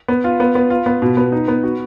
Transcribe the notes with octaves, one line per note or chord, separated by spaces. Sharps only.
B3
F4
B3
B3
F4
B3
B2
B3
D#4
B3
F#4